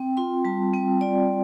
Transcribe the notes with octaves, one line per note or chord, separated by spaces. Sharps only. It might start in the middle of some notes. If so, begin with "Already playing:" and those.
Already playing: C4 G5
F4 C6
G3 A5
C4 G5
F4 D5